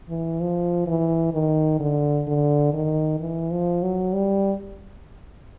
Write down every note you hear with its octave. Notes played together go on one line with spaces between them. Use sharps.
E3
F3
E3
D#3
D3
D3
D#3
E3
F3
F#3
G3